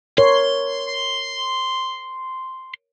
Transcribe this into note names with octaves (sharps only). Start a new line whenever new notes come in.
A#4 C#5 C6